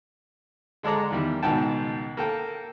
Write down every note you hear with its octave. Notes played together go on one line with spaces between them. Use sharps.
D3 G#3 A4 D5 A#5
E2 D#3 G3
C#2 G#2 B2 D#3 G5 A5
A#3 A4 G5